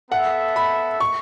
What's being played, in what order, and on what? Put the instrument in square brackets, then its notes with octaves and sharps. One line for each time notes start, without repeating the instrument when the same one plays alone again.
[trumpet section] B3 A4 E5 [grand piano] F#5
[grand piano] B5
C#6